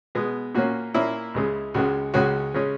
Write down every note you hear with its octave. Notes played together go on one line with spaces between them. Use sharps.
B2 G#3 B3
A#2 A#3 C#4 F#4
A#2 A#3 C#4 E4
C#2 C#3 G#3
C#2 C#3 G#3 F#4
C#2 C#3 G#3 C#4 F#4
C#3 G#3 C#4